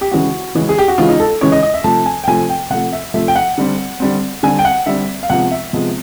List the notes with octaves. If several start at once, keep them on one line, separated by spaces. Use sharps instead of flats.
G4
C#3 E3 G#3 C#4 F#4
C#3 E3 G#3 C#4
G#4
G4
F#4
C#3 E3 G#3 C#4 F4
D#4
A4
C#3 E3 G#3 C#4 C#5
D#5
D#5
E5
C3 F3 A3 A5
G#5
G5
C3 F3 A3 G#5
G5
C3 F3 A3 F#5
E5
C3 F3 A3 E5
G5
F#5
D3 G3 C4
D3 G3 C4
D3 G3 C4 G#5
G5
F#5
D3 G3 C4 E5
F5
C3 F3 G#3 B3 F#5
E5
C3 F3 G#3 B3